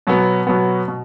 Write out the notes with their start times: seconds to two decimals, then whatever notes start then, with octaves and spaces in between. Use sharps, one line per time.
0.07 B2 F#3 B3
0.47 B2 F#3 B3
0.88 B2